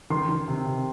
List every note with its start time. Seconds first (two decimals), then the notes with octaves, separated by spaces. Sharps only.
0.10 D#3 C6
0.29 D#3
0.48 C3
0.67 C3